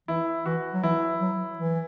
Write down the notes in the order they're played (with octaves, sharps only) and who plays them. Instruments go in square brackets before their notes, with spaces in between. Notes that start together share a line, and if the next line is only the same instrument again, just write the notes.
[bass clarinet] E3 [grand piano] E4
[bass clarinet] E3 [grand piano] F#4
[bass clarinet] F#3
[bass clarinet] E3 [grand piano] E4
[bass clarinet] F#3
E3